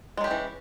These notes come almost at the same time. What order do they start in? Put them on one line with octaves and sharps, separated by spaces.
G#3 F#3 G4 C#4 E3